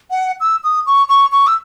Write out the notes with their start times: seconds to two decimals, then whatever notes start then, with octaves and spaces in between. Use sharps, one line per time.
0.11 F#5
0.40 E6
0.64 D#6
0.86 C#6
1.09 C#6
1.32 C#6
1.47 E6